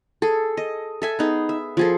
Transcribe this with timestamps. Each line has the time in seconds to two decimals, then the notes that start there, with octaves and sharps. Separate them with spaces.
0.22 G#4 A4
0.57 D#5
1.02 A4 E5 G#5
1.19 B3 D#4 G#4
1.49 E5
1.77 F3 G#4 A4